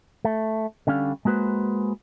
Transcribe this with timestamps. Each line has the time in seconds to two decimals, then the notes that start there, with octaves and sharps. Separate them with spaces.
0.25 A3
0.87 D3 G3 C#4 F5
1.25 G#3 A#3 F#4 B4 C5